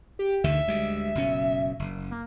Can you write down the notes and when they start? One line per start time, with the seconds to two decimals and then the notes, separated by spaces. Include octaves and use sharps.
0.19 G4
0.44 D2 D3 D#3 E5
0.68 D2 G3 G#3
1.15 F#1 B2 C#4
1.79 F#1
2.11 A#3